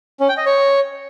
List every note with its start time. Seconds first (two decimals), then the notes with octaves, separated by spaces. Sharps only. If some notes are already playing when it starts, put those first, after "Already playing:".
0.20 C#4
0.29 G5
0.37 D#5
0.46 C#5